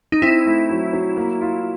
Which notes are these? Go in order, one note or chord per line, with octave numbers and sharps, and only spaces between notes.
D#4
C4 E4
A3
F#3
F#3
A#3
F4